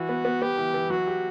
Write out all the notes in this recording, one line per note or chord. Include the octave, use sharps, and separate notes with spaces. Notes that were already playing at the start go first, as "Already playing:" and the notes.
Already playing: E3 F#4
B3
B3
B3 G4
E3
E3
F#3 F#4
G4